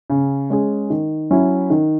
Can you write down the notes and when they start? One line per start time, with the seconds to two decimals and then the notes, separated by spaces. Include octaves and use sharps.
0.10 C#3
0.50 G#3 C#4 G#4
0.90 D#3
1.31 F#3 C#4 E4
1.70 D#3